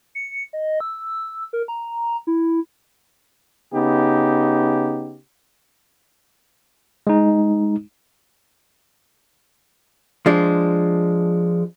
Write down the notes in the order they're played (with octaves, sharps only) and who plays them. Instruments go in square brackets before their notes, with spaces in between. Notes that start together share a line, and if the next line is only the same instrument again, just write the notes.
[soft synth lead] C#7
D#5
E6
A#4
A#5
E4
[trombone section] C#3 B3 D#4 G4
[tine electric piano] G#3 D#4
[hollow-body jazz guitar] F3 G#3 D4